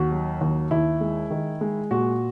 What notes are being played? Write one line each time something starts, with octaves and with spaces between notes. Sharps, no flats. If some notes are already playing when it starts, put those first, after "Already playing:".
Already playing: D#2 F#4
F#3
D#2
D#2 E4
G#3
D#3
G#3
A#2 F#4